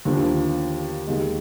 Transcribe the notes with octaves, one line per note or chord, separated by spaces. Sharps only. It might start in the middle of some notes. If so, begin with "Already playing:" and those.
D#2 D3 F3
D#2 D#3 G#3